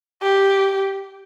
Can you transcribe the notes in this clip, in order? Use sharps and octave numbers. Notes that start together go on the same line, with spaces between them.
G4